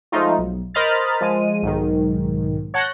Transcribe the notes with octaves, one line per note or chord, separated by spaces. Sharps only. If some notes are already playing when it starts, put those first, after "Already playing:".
F3 G#3 A3 D#4 F4
B1
A#4 C5 D#5 B5 F6 A6
F3 G#3 D#7
B1 G#2 D#3
C#5 F#5 A5 F#6 G6 A#6